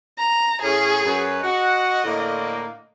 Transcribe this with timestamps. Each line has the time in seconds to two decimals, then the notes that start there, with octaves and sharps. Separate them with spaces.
0.18 A#5
0.62 A2 C#4 G#4
1.04 F#2 B4 C#5
1.42 F#4 D#5 F#5
2.04 A2 D3 A#3